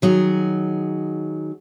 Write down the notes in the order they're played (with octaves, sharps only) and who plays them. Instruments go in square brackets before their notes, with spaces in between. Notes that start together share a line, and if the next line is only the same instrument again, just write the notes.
[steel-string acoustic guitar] D#3 F#3 G#4